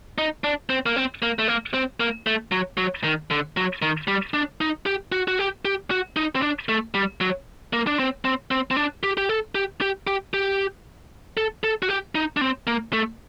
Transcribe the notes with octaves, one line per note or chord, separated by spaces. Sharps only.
D#4
D4
C4
A#3
C4
A#3
A3
A#3
C4
A#3
A3
F#3
F#3
D#3
D3
F#3
D#3
G3
D4
D#4
G4
F#4
F#4
G4
G4
F#4
D#4
C4
D4
A3
G3
F#3
A#3
D4
C4
C4
C4
C4
D4
G4
G4
A4
G4
G4
G4
G4
A4
A4
F#4
G4
D#4
D4
C4
A#3
A3